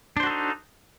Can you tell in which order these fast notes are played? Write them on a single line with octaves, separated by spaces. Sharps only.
D4 C5 F#4 A4 D#4